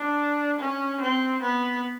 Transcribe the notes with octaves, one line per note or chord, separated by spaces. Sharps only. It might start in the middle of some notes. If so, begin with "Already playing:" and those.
Already playing: D4
C#4
C4
B3